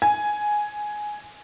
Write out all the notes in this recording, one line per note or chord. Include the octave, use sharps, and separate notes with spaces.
G#5